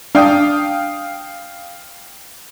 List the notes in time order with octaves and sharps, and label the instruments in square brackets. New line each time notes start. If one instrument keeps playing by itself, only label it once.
[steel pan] D4 [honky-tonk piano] F5 G5 D#6